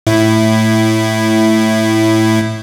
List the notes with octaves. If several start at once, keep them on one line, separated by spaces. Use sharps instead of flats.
A2 E4